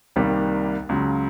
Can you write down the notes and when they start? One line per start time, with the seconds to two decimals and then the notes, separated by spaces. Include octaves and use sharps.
0.16 C2 C3 D#3 G3 A#3
0.89 C#2 C#3 F#3